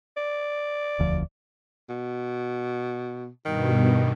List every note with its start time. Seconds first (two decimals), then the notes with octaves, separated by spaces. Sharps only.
0.17 D5
0.99 E1 D2 F3
1.89 B2
3.45 G2 B2 D#3